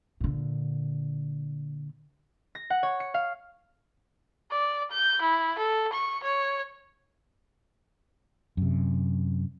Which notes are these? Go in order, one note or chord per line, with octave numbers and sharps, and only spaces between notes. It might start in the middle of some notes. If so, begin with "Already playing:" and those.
A#2 D3
A#6
F#5
C#5
C#7
F5
D5
G6
E4
A4
C#6
C#5
F#2 C3